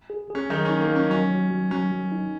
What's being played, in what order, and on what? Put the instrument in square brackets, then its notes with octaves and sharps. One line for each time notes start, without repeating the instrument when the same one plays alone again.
[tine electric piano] G#4
[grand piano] C#4 [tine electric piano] G#4
[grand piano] D#3 D#4 [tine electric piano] F#3
[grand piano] C#4
[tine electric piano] D#4
[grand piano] A#3
[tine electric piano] F#3 [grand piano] C#4
[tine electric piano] F#3 [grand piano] C#4
[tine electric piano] F#3
F#3
[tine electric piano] F#3 [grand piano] C#4
[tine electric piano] F#3
D#4